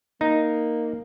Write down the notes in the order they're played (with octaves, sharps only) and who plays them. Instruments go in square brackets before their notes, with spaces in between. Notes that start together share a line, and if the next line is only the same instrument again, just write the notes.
[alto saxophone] A#3 [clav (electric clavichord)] D#4